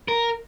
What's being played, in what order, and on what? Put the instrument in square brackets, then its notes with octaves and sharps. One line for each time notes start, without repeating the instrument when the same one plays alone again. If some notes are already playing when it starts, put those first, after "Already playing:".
[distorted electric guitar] A#4